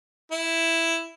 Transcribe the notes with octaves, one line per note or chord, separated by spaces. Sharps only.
E4